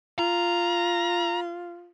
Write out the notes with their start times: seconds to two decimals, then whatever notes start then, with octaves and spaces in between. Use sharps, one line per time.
0.19 F4 A#5